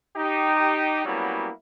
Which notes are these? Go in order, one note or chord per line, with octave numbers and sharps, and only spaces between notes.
D#4 G4
F#3 G3 A#3 B3 C#4 E4